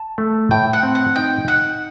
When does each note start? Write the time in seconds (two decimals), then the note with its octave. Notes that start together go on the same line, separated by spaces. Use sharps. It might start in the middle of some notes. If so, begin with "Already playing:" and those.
Already playing: A5
0.18 A3
0.51 A2 G5
0.73 F#5
0.83 C4
0.95 F#5
1.16 D#4 G5
1.48 D#4 F#5